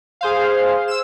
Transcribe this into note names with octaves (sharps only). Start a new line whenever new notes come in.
G#4 C5 F5
E6 E7